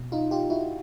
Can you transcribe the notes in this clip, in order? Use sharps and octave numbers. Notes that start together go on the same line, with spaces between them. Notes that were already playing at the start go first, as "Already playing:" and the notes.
Already playing: B2
D#4 F4
F4 G4
E4 F#4